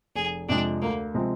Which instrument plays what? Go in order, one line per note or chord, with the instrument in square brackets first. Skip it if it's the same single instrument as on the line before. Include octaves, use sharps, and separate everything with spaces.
[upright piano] F1 [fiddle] G#4
[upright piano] F2 C3 F3 G#3 [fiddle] D4
[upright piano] D2 [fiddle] A#3
[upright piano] C3 F3 G#3 C4